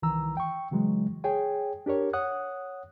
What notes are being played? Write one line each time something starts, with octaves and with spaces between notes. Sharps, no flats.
C2 D#3 E3 A#5 E6
G5 C#6
C#3 E3 F#3 G#3
G#4 C#5 G5 G#5
D4 G4 A#4 C#5
C#5 F#5 D#6 F#6